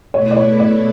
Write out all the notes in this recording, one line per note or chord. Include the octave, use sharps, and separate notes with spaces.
B2 A3 E4 B4 C#5
D5
C#5
D5